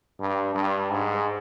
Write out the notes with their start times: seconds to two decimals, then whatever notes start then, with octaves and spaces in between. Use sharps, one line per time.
0.20 G2
0.55 G2
0.91 G#2